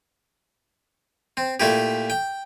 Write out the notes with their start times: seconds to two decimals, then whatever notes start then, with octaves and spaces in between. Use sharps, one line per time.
1.37 C4
1.60 A#2 A3 E4 G4
2.10 G5